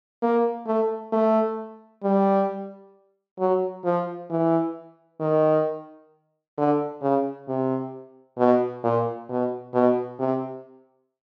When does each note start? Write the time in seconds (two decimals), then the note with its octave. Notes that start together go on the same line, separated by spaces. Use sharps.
0.23 A#3
0.67 A3
1.12 A3
2.03 G3
3.39 F#3
3.85 F3
4.30 E3
5.20 D#3
6.57 D3
7.02 C#3
7.48 C3
8.38 B2
8.84 A#2
9.29 B2
9.74 B2
10.20 C3